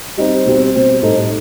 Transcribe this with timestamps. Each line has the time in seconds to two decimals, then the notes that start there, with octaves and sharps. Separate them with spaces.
0.17 G3 C4 D#4 C5 D#5
0.46 B2 G3 C4
0.74 B2 G3 C4
1.02 A2 G3 D#4 A4